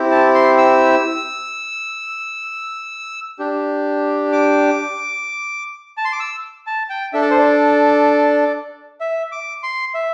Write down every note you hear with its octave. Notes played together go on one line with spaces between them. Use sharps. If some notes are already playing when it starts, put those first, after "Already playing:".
Already playing: C4 E4 G4
A5
C6
E6
D4 G4
D6
A5
C6
D6
E6
A5
G5
D4 A4 E5
D5
C5
D5
E5
D6
C6
E5